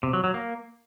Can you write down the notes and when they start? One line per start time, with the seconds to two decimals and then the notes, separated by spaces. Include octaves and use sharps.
0.03 C3
0.13 F#3
0.24 F#3
0.34 A#3